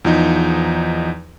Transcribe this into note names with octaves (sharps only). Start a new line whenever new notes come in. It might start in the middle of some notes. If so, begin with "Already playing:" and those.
E2 F3 D#4